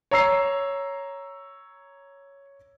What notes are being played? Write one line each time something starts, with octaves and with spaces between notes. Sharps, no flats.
C#5 A#5 E6 C7